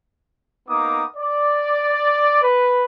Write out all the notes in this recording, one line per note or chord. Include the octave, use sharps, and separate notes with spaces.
A#3 B3 D#4 D6 D#6
D5
B4